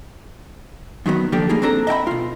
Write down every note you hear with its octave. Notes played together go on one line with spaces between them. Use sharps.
F#2 D#3 F#3 B3
D3 F3 A#3 D4 G4 A4
G3 A#3 D#4 G#4
C4 D4 A4 A#5
D#5 E5 G5 B5
B2 F4